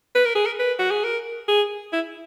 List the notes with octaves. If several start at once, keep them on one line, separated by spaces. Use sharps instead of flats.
B4
A#4
G#4
A#4
B4
F#4
G#4
A#4
G#4
E4